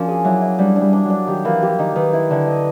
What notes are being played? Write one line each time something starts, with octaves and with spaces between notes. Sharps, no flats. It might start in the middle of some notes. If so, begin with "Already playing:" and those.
Already playing: F3 A#3 C#4 D4 F#4
G#4
F#3 E4
E4
G3 D4
D4
G3
D4
F#3 D4
D#3 G4
E3 A#3
F3 G4
D#3 D#4
D#3 B4
E4
D3 E4
D#5